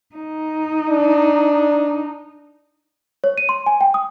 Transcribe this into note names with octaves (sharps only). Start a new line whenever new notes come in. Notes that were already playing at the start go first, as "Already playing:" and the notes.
D#4
D4
C#5
D#7
C6
G#5
G5
D#6